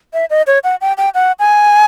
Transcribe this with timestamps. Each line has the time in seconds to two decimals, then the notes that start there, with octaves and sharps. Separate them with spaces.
0.14 E5
0.30 D#5
0.47 C#5
0.64 F#5
0.81 G5
0.98 G5
1.14 F#5
1.39 G#5